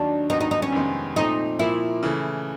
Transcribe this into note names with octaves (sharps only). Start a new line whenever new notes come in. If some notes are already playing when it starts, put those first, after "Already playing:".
Already playing: D#2 D#3 F#3 D4
D#2 D#3 F#3 B3 D#4
D#4
D#4
C#4
F2 C3 D#3 G#3 B3
A#2 F3 A3 C4 D#4
A#2 F3 A#3 E4
C#3 E3 A3